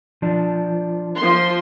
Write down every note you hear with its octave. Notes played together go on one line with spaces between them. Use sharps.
F3 D4
F3 C6